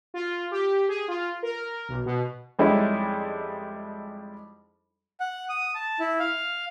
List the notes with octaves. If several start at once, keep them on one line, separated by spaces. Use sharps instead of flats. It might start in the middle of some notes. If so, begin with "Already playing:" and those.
F4
G4
G#4
F4
A#4
B1
B2
F2 G3 G#3 C#4 D#4 E4
F#5
D#6
A5
E4
F5